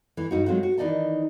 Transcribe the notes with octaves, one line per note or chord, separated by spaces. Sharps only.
E3 A3
G2 D#4 F#4
F#3 G#3 A3 C4 F4 F#4
F#4
D#3 E3 D#4 D5 D#5 A5